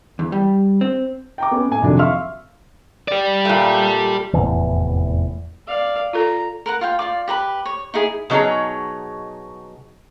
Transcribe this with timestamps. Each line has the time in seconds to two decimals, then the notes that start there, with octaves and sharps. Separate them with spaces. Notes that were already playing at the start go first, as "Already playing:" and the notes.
0.19 E2
0.32 G3
0.81 C4
1.38 G5 A#5 D6
1.51 B3 C#4
1.69 A2 G#5
1.82 F2 C3 D#3 F3 F#3 D4
1.99 E5 F5 C6 C#6 E6 F6
3.08 G4 D5
3.45 A#2 A3
4.34 F1 E2 A2 E3
5.68 D5 F5
6.13 F4 A4 A#5
6.66 A#4 B4 F#5
6.81 F4 F5 G5
6.99 F4 D5 D6
7.28 G4 B4 A#5 B5
7.66 C#5
7.94 D#4 E4 G#4 G#5
8.30 B2 F#3 D#4 G#4 C#5